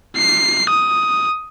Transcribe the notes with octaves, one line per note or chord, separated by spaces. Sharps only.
C7
D#6